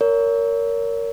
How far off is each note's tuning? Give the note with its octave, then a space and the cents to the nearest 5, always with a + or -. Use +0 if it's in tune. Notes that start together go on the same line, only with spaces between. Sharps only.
A#4 -5 C#5 +30